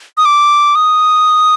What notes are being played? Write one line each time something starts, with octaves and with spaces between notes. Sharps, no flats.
D#6
D6
D#6